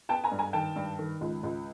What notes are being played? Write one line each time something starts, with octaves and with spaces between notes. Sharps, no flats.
B3 G5 A5
G#5 A#5
G2
G#5 A#5
D#3 G5 A5
G2
D#3
C#2
C#2